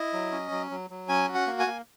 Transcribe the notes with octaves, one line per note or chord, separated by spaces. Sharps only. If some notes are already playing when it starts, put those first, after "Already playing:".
Already playing: E4 D#5
F#3
C#4
F#3
F#3
F#3
C#4 G#5
F#4
F#5
A#3
G#5
A#3